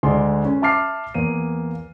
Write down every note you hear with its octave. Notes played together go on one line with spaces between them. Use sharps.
D2 G#3 D5 C6
C#4
E5 A5 D6 F6 C7
E2 A#3 D#7